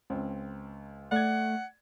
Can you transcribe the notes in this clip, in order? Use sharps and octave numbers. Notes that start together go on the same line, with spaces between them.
C#2 C4
A3 D5 F#5 G#6